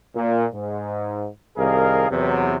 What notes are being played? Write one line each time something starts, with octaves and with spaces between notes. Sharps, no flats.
A#2
G#2
C2 D#3 G#4 A#4 D#5 F5
E2 C3 F#3